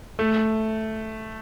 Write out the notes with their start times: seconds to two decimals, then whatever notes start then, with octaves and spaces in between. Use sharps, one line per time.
0.19 A3